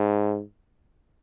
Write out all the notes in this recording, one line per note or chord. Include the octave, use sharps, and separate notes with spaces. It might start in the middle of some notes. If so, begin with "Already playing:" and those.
Already playing: G#2